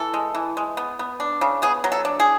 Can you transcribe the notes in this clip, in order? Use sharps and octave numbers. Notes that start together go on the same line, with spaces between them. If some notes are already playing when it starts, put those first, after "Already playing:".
Already playing: E3 A4
G#3
E3
G#3
B3
B3
D4
C#3
B3 G#4
F#3
A4
D4
G#4